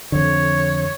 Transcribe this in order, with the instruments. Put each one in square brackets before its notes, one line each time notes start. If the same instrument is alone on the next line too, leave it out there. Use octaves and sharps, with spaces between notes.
[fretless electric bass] F2 D3 [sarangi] C#5